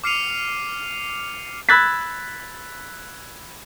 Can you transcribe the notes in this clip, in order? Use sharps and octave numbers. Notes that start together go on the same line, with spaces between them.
D6 F6 C7 C#7 D#7 F7
B5 E6 F#6 G#6 A6 B6